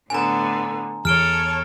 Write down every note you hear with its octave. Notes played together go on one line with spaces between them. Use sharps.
A2 D3 B3 G#5 A#5
E2 A4 C#5 F6 D7 G7